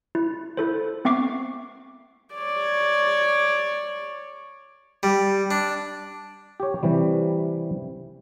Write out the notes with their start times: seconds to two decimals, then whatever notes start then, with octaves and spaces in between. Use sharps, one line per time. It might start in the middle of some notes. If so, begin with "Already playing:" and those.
0.15 E4
0.57 E4 A4 C5
1.05 B3 C4 E5 C#6 D6 C7
2.35 C#5 D5
5.03 G3
5.51 D4
6.60 G4 C#5
6.83 C3 E3 G3